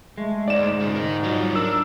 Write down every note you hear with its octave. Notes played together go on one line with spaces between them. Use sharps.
G#3 A3
D2 G#2 D5 E7
D2 F4
A#4 D#5
F#3 G3 F4
D4 A#4 E6